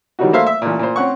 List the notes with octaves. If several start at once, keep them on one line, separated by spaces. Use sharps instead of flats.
D#3 E3 F#3 G3 D#4 F#4
A3 A#3 C5 E5 F5
E5
A1 A#2
A#2 C5
C4 C#4 F#5 C#6